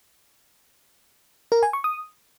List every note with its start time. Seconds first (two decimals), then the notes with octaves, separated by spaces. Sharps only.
1.52 A#4
1.63 G#5
1.73 C#6
1.84 D#6